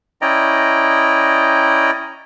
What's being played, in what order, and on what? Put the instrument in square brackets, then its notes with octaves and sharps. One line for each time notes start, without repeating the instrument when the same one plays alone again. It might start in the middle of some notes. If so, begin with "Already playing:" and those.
[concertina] C#4 E4 D5 D#5 G5 A#5